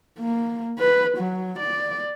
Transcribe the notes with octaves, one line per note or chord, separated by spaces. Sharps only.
A#3
B4
F#3
D5